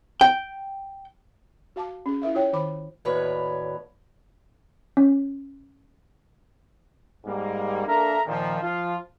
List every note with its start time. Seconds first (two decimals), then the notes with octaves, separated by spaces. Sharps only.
0.21 G5
1.76 F#4 F5 A5 D6
2.06 C#4 G#4
2.22 E4 A#4 E5 F5
2.34 E4 F4 C#5 G5
2.53 D#3 C5 B5 D6
3.05 D#2 A2 F#4 B4 C#5 D5
4.97 C#4
7.26 G#2 G3 A#3
7.87 A#3 D4 A4 A#4 E5 A#5
8.27 A#2 D#3 F3
8.62 F3 F4